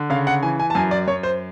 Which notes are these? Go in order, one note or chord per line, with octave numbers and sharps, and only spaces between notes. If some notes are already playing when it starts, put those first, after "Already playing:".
Already playing: D3
C#3 F5
F#5
E3 G#5
G#5
A5
F#2 G#5
D5
F#2 C#5
C5